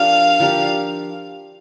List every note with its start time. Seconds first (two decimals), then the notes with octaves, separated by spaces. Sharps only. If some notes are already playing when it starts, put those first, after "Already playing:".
Already playing: F3 D4 G4 A#4 F5
0.40 F3 D4 G4 A#4